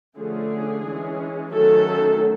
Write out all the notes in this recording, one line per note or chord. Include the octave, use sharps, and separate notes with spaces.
D3 F3 A3 C#4 G#4
E3 G#3 C#4
D#3 F#3 A3 C#4 A4